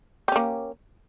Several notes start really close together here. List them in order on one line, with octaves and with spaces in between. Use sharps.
G4 C#4 A#3